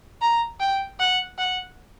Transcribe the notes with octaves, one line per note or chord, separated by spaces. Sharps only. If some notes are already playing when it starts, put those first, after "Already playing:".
A#5
G5
F#5
F#5